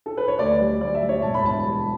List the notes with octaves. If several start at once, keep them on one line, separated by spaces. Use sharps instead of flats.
A4
B4
C#5
D2 D5
G3
D2 D5
E5
G3
C#5
E1 A5
B5
E1 A5
G3